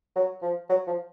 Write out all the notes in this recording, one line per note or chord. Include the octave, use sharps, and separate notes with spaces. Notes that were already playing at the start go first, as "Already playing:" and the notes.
F#3
F3
F#3
F3